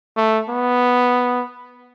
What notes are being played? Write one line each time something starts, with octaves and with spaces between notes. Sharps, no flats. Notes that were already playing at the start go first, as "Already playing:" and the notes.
A3
B3